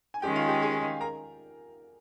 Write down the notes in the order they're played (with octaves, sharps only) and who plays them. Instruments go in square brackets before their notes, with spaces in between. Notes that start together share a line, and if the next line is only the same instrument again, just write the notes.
[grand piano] G#5
[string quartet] D#3 G#3 C#4 [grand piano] G4 G5
[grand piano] F4 F5
G4 G5
G#4 G#5
A#4 A#5